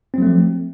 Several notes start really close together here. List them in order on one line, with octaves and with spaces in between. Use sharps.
C4 F#3 A3 F3